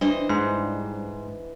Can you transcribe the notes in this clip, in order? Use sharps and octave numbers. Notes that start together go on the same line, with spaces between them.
E3 G3 D4 C5 D#5
G#2 C6